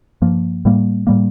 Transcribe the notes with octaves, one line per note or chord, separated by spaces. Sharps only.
G2 F3 A#3
A2 G3 A#3
A2 G3 A#3